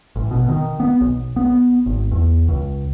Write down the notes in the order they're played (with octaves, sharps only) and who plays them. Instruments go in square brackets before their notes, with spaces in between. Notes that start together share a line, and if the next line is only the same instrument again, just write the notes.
[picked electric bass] A1
B2
D#3
B3
B1
B3
G#1
E2
C#2